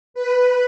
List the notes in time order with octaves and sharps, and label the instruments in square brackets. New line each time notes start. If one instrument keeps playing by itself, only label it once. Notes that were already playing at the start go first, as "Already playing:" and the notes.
[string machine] B4